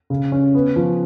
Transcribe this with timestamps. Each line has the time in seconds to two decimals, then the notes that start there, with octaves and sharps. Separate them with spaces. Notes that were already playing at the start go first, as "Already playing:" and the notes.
0.10 C#3
0.32 C#4
0.55 B3
0.76 F3